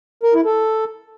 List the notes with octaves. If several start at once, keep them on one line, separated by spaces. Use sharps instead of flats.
A#4
E4
A4